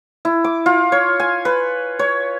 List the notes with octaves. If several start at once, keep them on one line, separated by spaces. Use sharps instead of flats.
E4
D6
F4
C#5
G#5
B4
C#5